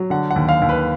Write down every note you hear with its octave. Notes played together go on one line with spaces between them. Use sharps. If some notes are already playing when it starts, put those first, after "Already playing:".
Already playing: F#3
D3 F#5
F#5
D#2
F5
D#2
B4